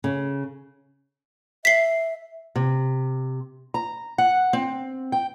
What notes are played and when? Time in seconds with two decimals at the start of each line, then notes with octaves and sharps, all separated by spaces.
0.04 C#3
1.65 E5 B6 C7
2.56 C3
3.74 A#5
4.18 F#5
4.53 C4
5.12 G5